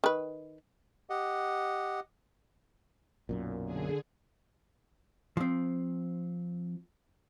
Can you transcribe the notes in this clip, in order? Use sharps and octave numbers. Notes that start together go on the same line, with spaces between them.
D#3 B4
G4 D#5 F#5
B1 F#2 A#2
D3 G#4
F3 C4